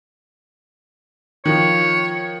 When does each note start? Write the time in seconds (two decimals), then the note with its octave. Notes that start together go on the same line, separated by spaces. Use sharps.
1.45 D#3 F3 C#5